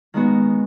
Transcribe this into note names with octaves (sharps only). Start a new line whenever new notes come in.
D#3 G#3 B3 F#4